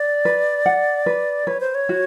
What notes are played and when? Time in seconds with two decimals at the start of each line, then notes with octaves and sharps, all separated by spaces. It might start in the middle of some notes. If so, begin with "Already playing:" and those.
Already playing: D5
0.25 B4
0.66 F#5
1.06 B4
1.47 B4 C#5
1.60 C5
1.74 C#5
1.89 F#4